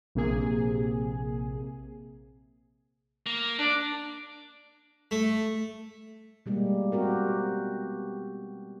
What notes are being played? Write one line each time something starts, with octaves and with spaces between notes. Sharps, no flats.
A#1 C3 A#3 G#4
A#3
D4 D5
A3
B2 G3 G#3 A#3
B3 C4 F#4 G4 A#4